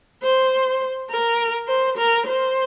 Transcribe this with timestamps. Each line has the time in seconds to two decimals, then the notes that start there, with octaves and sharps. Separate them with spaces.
0.23 C5
1.09 A#4
1.67 C5
1.97 A#4
2.26 C5